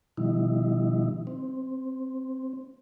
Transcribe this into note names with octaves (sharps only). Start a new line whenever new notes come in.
B2 D#3 F3 G3 D#4 E4
C4